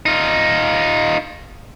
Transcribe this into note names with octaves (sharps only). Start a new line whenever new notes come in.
D#4 F4